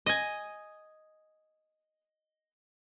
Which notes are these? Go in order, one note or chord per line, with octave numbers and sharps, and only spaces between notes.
D#5 G#5